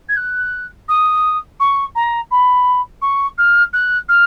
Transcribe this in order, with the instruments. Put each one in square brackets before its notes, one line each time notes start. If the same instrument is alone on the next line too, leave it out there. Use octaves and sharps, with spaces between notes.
[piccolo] G#6
F#6
D#6
C#6
A#5
B5
C#6
F6
F#6
F6